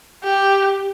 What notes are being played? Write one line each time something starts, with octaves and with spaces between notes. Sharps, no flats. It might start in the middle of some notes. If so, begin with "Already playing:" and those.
G4